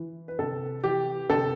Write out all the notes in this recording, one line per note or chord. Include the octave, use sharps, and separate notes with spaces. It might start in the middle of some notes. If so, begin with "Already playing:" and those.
Already playing: E3
B4
C3 A4
E3 G4
C3 A4